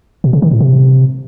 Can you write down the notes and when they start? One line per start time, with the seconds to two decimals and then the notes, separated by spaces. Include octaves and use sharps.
0.24 B2
0.33 C#3
0.42 D#3
0.51 A2
0.60 C3